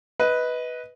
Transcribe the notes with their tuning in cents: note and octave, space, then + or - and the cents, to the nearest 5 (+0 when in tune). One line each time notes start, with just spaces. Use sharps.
B4 +0 D#5 +20